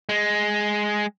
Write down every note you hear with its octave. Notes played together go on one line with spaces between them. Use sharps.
G#3